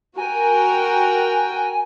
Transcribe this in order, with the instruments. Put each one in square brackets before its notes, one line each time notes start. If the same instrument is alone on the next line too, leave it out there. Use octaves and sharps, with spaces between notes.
[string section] F#4 A#4 G5 [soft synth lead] G#5